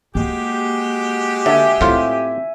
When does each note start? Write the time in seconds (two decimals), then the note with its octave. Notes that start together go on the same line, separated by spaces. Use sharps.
0.15 G#3 A#3 F#4 G4
1.46 D3 E5 G#5
1.81 A2 C4 F4 C5